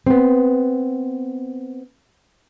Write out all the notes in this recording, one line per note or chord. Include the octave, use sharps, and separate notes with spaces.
B3 C4